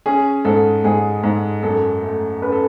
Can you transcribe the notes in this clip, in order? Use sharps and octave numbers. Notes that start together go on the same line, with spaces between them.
C#4 G#4
G#2 A4
G#2 G#4
G#2
F#2 A4
A3
C#4 B4
A4